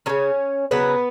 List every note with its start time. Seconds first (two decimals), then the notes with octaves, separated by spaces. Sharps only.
0.06 C#3 F#3 C#4 C#5
0.71 C#3 F#3 B3 B4